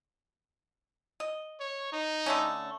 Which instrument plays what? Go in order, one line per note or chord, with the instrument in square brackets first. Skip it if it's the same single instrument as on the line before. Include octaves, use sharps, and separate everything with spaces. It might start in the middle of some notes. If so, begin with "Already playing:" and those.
[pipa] D#5
[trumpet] C#5
D#4
[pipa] D3 A3 C#4